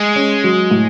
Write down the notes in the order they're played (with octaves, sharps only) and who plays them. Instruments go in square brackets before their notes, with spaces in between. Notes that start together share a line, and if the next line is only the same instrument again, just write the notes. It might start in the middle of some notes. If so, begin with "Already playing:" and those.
Already playing: [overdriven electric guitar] G#3
[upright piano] C#4
F#3
A2